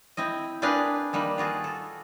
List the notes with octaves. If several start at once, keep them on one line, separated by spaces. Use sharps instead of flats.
C4 E4 D#5
C4 D4 G#4 A#4 B4 F5
D#3 G3 A#3 B4
F4 F#4 G#4 A4
A4